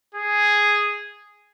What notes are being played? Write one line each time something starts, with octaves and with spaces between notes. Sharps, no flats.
G#4